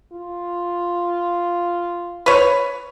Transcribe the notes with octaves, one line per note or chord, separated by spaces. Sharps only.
F4
B4 C#5